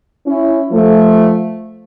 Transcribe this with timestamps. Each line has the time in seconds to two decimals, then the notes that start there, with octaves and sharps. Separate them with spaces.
0.26 C#4 E4
0.71 F3 A3